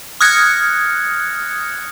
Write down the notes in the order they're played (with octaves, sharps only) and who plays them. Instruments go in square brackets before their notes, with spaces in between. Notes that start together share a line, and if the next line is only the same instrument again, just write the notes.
[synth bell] D#6 F6 F#6 G#6 A#6 C#7